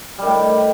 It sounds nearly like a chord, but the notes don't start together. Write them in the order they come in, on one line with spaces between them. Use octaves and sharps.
G3 D#3 A2